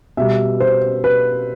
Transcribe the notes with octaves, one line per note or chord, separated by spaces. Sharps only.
B2 G3 E5
C5
B4